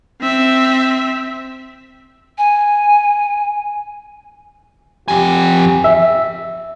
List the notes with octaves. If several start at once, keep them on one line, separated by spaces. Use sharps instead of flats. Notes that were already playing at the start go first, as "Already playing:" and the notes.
C4 E5
G#5
F2 G4 G#5
E5